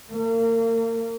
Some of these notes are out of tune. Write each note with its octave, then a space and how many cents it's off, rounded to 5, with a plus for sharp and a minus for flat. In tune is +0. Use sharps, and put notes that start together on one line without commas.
A#3 -35